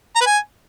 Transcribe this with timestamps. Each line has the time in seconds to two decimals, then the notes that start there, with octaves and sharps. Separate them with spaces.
0.16 A#5
0.21 B4
0.26 G#5